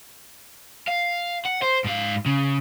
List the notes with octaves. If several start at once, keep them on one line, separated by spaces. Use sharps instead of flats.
F5
F#5
C5
G#2 F5
C#3